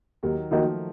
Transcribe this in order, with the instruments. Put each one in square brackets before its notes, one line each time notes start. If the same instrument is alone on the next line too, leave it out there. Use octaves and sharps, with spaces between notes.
[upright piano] D#2 [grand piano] D#3 F#3
[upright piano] D#3 A#3 D#4 F#4 [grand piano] F3 A3